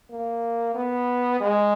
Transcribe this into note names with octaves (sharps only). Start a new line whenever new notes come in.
A#3
B3
G#3